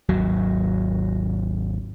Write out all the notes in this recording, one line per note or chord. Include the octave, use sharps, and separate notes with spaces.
G#1 D#2 F#3